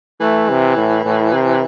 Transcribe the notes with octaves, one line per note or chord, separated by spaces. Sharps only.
E3 A3
C3
A2
A2
C3